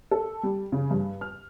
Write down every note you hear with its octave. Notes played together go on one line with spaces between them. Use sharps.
A4
G3
C#3
G2
F6